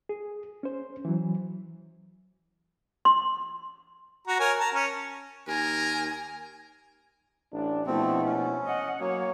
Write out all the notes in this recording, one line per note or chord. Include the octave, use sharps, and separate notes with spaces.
G#4
C#4 C5
E3 F#3
C6
F#4 A#5
A#4 C#5 G#5
A5 A#5
C#4
D#2 A#4 G#5
A1 D4
A#1 B2 F3 A3 C4 E4
C#4
D#5 F#5
F#3 A#3 C#5